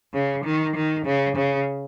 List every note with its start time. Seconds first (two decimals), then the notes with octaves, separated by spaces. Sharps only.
0.14 C#3
0.45 D#3
0.75 D#3
1.05 C#3
1.36 C#3